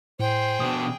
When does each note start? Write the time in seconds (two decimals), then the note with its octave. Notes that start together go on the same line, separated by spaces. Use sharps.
0.20 A2 G#4 C5 G5
0.60 B2 D4 D#6